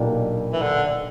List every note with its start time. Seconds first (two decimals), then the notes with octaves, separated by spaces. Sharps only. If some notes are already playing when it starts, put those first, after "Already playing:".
Already playing: B1 A#2 A#3 D4 G4
0.53 E3
0.62 D3